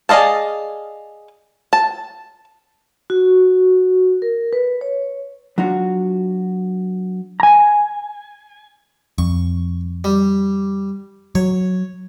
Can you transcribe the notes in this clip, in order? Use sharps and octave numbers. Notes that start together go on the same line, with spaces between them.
G#4 D5 D#5 F5 A5
A5
F#4
A#4
B4
C#5
F#3 D4 F4 F#4
G#5 A#5
F2 C#6
G3
F#3 C#5